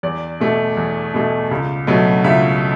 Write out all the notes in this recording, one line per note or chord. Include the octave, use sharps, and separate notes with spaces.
E2 D5
B2 A3
E2
B2 A3
C#2
B2 F#3 A3
C#2 E5